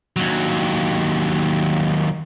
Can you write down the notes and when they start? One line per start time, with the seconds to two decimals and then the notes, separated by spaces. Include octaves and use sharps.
0.17 D#2 F#3